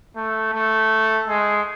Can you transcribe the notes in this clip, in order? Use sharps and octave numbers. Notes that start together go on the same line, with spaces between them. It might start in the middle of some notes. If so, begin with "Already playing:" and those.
A3
A3
G#3